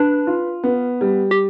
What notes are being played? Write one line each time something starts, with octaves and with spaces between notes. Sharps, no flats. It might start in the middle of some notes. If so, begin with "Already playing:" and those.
Already playing: D4 B4
F4
B3
G3
G4